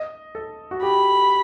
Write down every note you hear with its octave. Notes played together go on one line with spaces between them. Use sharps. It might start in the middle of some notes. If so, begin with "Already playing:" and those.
Already playing: D#5
A4
F#4
G4 B5